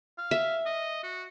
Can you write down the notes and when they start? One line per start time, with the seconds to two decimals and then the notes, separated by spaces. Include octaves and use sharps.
0.18 F5
0.31 E5
0.66 D#5
1.03 F#4